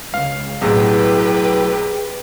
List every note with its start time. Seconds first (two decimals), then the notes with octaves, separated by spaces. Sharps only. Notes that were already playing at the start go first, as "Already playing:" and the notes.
0.14 C#2 F5
0.61 B1 A2 C3 F#3 G4 G#4 B4